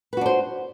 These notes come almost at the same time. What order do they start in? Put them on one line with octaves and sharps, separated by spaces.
B4 F#4 D4 C5